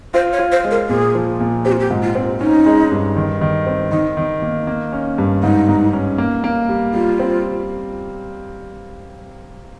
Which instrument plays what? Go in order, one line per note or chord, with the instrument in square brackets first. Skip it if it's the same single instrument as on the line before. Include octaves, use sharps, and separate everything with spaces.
[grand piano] F4 [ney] C5
[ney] C#5
[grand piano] F4
[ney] C5
[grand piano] G#3
[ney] A#4
[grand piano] A#2 [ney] G#4
[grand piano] F3
A#2
[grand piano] C4 [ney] G4
[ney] F4
G4
[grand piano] G#2
[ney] F4
[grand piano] C4
[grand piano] C#4 [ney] D#4
[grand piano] G#3
G2
D#3
D#3
C4
[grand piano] D#3 [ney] D#4
[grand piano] D#3
A#3
A#3
C#4
G2
[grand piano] G#2 [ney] D#4
[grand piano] G#2
C#4
A#3
A#3
G3
[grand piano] G3 [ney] F4
[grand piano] C4